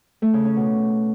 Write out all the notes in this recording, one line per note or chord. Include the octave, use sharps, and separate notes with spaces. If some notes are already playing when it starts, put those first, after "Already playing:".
A3
C#3
C#4
B2